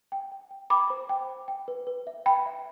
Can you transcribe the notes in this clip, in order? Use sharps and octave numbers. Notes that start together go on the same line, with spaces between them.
G5
G5
G5
G5 B5 D6
C5
G5
G5
G5
B4
B4
E5
G5 B5
E5